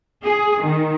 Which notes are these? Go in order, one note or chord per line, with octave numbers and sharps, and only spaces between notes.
G#4
D#3